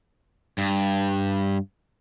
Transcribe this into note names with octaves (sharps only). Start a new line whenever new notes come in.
G2